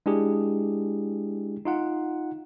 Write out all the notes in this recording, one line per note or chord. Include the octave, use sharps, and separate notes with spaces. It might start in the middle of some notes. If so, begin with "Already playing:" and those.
G#3 D4 E4 G4 G#4
D#4 F4 F#5